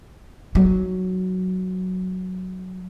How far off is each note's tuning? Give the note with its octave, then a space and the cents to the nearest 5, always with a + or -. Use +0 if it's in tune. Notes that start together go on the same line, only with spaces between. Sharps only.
F#3 +0 D#4 +0